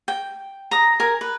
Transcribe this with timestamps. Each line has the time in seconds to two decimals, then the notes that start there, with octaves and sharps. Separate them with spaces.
0.08 G5
0.71 A#5 D#6
1.00 A#4 G#5
1.21 B4